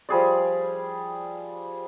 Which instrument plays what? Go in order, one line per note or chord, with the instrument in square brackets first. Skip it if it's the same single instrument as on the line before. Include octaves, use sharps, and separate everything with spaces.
[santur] F3 G3 G#4 D5